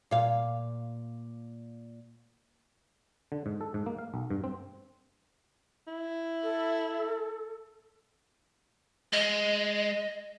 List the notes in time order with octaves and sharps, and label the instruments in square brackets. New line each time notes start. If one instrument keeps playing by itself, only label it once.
[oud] A#2 F5
[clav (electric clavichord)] D3
G#2
A4
G#2
A#3
F5
B1
G2
C4
[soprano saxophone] E4
[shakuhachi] A4
[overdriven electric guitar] G#3 [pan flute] D#5